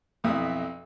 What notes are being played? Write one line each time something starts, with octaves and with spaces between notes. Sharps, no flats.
B1 F2 E4 E5 D#6